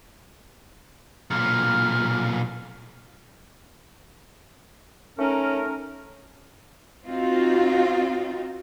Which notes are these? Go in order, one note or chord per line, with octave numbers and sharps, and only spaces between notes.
B1 A#2 F6
A3 C#4 D#4 A#4
C4 D#4 F4 F#4